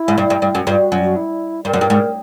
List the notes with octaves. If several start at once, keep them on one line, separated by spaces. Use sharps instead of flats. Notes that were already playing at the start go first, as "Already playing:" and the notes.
Already playing: E4
G#2
G2
G2
G2
F#2
G2 F4
F#4
F#2 F4
F#4
E4
G2 A#4
F#2
G2
G#2